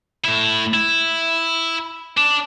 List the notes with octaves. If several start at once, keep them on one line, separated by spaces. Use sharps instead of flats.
A2 E4
E4
D4